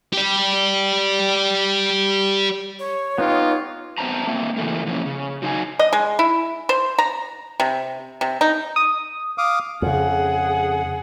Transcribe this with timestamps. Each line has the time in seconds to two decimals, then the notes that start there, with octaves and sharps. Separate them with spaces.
0.13 G4 D5
2.79 C#5
3.18 B3 D#4 F4 G4
3.98 B3 C4 C5 E5 A5 A#5
4.27 A#3 C4 E5
4.57 C#3 E3 A3 A#3
4.87 E3 F3 A#3 C#4
5.06 C#3
5.42 F#3 D#4 F5 G#5
5.79 D#5
5.93 G#3
6.19 E4
6.69 C5
6.98 A#5
7.60 C3
8.21 C3
8.41 D#4
8.76 D#6
9.38 F5 D6 D#6
9.82 F2 C#3 G#4 F#5